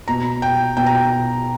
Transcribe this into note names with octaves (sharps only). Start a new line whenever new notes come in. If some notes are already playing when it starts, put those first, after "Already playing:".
B2 A#5
G5
B2 G5
A#5
G5